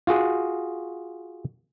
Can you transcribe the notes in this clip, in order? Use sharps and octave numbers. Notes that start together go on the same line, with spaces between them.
F4 F#4 G#4